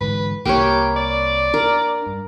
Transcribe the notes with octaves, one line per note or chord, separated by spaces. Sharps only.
G#2 D3 E3 B4
C2 A#3 G4 B4 C#5
D5
D4 A#4
G2